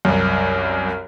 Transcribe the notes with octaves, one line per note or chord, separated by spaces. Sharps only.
C2 F#2